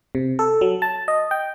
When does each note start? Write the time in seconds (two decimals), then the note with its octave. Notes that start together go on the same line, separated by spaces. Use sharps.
0.15 C3
0.39 A4
0.61 F#3
0.82 A5
1.08 D#5
1.31 G5